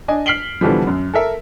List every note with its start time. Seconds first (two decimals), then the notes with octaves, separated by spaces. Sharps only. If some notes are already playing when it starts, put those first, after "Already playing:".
0.08 D4 D#5 G#5
0.26 F6 B6 C7 D7 F#7 G7
0.61 B2 D3 E3 F3 G3
0.87 F#2
1.14 A4 A#4 E5